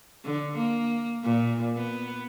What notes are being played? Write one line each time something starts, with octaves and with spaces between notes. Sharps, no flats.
D3
A#3
A#2
B3